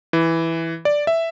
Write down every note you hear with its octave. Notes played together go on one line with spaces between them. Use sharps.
E3
D5
E5